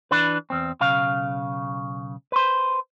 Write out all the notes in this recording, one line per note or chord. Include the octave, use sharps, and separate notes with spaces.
E3 D4 B4
E2 C4
B1 C#3 F5
B4 C5